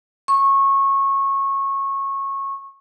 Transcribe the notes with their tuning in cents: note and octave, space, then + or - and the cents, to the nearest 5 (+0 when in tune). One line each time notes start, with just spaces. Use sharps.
C#6 -20